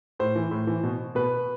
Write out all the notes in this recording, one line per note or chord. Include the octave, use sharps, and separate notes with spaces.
A2 C5
E3
A2
E3
B2
B2 B4